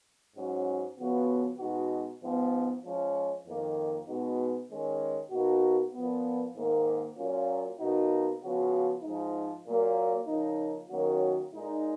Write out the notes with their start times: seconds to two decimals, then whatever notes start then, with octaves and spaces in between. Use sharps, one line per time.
0.34 G#2 F#3 C#4 F#4
0.97 C#3 F3 B3 F#4
1.59 B2 G#3 B3 D#4 F#4
2.21 G#2 F3 B3
2.82 F3 G#3 C#4
3.45 F2 D#3 A#3
4.07 B2 G#3 B3 D#4 F#4
4.69 D#3 G#3 C#4
5.31 B2 A#3 D#4 F#4
5.93 A#2 F3 B3
6.55 G#2 D#3 A#3
7.17 A#2 F#3 A#3 C#4 F4
7.79 B2 A#3 D#4 F#4
8.42 C#3 F3 B3 F#4
9.03 G#2 F3 G#3 D#4
9.66 A#2 F#3 A#3
10.27 C#3 F3 A#3 D#4
10.90 D#3 F#3 A#3 C#4 F#4
11.52 A#2 G#3 D#4